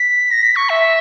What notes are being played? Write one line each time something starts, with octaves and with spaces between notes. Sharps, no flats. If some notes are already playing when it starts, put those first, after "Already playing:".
Already playing: B6
A#6
B6
C#6
E5